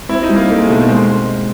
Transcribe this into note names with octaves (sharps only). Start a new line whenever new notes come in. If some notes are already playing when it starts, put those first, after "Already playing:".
C4 E4
D#4
G3
A#3
A3 D#4
G#3
B2 A3
G#3 C4